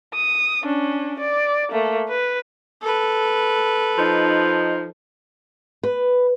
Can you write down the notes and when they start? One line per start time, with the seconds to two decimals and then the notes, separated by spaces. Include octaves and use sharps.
0.14 D#6
0.64 C#4 D4
1.20 D5
1.71 A3 A#3
2.08 B4
2.82 A4 B4
3.99 F3 D#4
5.83 B4